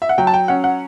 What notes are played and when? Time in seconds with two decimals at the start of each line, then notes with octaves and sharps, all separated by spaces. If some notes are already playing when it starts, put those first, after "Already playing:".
0.02 E5
0.09 F#5
0.18 F#3 G5
0.27 A5
0.34 G5
0.48 C#4 F#5
0.64 F#5